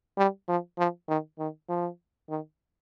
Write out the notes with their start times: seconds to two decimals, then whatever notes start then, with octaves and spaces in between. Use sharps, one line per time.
0.18 G3
0.48 F3
0.78 F3
1.08 D#3
1.39 D#3
1.69 F3
2.29 D#3